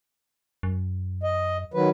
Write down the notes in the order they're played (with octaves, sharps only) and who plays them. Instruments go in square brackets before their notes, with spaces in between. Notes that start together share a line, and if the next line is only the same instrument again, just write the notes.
[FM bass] F#2
[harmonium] D#5
D#3 F#3 B4